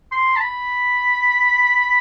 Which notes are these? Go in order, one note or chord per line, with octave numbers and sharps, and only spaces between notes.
C6
A5
B5